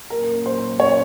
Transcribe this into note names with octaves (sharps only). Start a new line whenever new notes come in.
A#2 F#3 A#3 C#4 A#4
C5
C#5